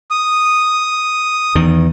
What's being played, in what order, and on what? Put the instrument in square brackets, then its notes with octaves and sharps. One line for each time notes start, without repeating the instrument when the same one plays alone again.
[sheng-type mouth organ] D#6
[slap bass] E2 D#3